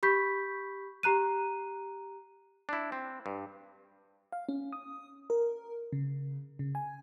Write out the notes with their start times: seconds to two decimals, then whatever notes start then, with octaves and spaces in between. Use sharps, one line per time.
0.03 G4 B5 C#6 G6 B6
1.03 G4 A#5 F#6 D#7
2.69 D4 E4
2.92 C4
3.26 G2
4.32 F5
4.49 C#4
4.73 D#6
5.30 A#4
5.93 C#3
6.59 C#3
6.75 G#5